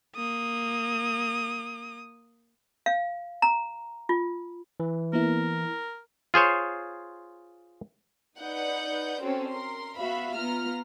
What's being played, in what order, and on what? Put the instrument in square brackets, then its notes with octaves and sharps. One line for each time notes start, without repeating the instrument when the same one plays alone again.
[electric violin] A#3 D#6
[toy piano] F5
A#5
F4
[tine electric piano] E3
[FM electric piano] A#3 B3 E4 [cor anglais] A#4
[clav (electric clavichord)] F4 G#4 C5 C#5
[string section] D#4 B4 D5 F#5 G6
C4 C#4 F#4 A4 C#5
A#4 C6
B3 F#4 E5 F5 B5
B3 F4 A#5 F6